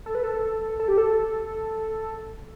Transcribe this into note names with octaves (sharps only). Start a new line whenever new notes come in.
A4
B4
A4
A4
G4
A4